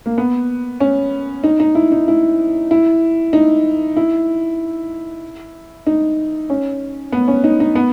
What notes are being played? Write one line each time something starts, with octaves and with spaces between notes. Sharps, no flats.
A#3
B3
C#4
D#4
D#4
E4
D#4
E4
E4
D#4
E4
D#4
C#4
B3
C#4
D#4
D#4
B3